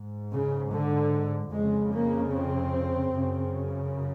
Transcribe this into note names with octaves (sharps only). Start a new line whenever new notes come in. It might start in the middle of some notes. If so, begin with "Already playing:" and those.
Already playing: G#2
C#3
D3
F2 C#3 G#3
A#3
C4
F#2 C#3